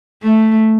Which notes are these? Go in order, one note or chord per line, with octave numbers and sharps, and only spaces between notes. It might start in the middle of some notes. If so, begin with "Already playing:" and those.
A3